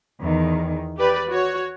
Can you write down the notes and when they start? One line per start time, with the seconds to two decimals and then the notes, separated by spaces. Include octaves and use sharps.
0.21 E2 D#3
0.98 G4 B4 D5
1.29 F#4 C#5